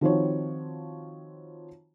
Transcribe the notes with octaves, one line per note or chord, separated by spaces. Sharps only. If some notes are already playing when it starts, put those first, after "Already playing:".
D#3 F3 C4 F#4 C#5